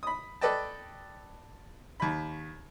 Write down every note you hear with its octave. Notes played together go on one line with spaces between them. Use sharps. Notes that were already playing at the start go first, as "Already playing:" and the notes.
B5 D#6
A4 B4 D5 D#5 G5 A5
D#2 B5